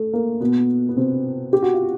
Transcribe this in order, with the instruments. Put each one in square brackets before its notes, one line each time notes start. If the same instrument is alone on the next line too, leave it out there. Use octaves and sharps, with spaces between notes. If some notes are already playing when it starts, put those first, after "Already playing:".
Already playing: [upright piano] A3
A#3
B2 B3
B3
C3 C4
G4
F#4
F4